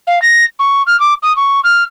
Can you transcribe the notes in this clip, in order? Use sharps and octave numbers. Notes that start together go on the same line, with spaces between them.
F5
A#6
C#6
F6
D6
D#6
C#6
F6